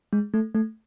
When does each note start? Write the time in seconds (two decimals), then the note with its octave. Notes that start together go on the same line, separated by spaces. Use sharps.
0.13 G#3
0.34 A3
0.55 A3